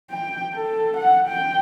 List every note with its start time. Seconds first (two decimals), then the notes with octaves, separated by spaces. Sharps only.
0.11 G5
0.56 A4
0.97 F#5
1.28 G5